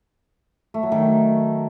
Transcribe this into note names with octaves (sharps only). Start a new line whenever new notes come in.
A3
F#3
D#3